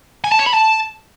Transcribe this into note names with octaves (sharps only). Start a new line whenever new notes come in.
G#5
A5
C#5
B5
A5